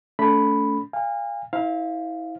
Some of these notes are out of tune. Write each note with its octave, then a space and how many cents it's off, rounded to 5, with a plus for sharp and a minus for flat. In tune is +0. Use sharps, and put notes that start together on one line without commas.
A3 +0 C#4 +45 B5 +0
F5 +0 G#5 -40
E4 -30 C5 +15 F5 +5